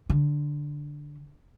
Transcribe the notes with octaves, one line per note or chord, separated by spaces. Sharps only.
D3